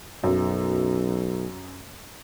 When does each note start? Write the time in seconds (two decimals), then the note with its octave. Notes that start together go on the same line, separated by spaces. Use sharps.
0.24 B1 F#2